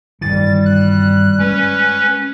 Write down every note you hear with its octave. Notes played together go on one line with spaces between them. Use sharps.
G2 D#3 E3 G3 A6
F#6
G#3 C#4 B4